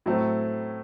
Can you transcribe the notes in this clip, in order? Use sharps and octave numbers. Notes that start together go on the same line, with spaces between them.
A2 F#3 A3 C4